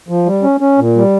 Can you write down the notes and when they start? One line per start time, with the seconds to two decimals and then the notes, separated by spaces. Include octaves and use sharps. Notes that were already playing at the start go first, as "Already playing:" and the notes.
0.09 F3
0.26 G3
0.43 C#4
0.60 C#4
0.78 A#2
0.96 G3